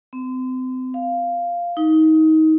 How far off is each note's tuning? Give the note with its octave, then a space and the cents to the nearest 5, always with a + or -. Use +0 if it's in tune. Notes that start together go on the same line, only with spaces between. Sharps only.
C4 -35
F5 -5
D#4 +20